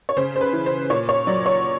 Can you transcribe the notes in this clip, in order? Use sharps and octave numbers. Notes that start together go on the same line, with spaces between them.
C#5
C#3 C5
C5
B4
E3
C5
A#2 C#5
C#5
F#3 D5
C#5